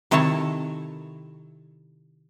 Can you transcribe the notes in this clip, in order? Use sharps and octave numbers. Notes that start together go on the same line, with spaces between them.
C3 D#3 E4 A4 C#5 A5